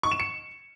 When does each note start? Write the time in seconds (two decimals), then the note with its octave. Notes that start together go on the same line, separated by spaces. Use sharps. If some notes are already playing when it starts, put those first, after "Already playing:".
0.03 C#6
0.12 E7
0.20 C#7